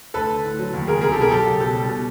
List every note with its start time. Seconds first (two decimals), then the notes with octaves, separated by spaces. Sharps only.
0.14 D2 A4 B4
0.30 D3
0.44 A2
0.59 F#3
0.73 D#2
0.87 C#3 G#4 A#4
1.01 C2 G#4 A#4
1.11 G4 A4
1.17 B2 G#4 A#4
1.31 F#2 G4 A4
1.46 C#3
1.60 B2 G4 A4
1.75 G3
1.89 B2